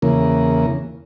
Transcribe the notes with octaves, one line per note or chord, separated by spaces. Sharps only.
E2 C#3 A#3